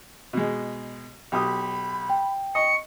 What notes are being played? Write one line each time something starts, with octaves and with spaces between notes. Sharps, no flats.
B2 G#3
B1 G4 B5 D#6
G5
D#5 C#6 C#7